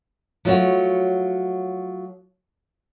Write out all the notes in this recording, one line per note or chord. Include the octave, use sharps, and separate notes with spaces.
F3 F#3 A3 F#4 C#5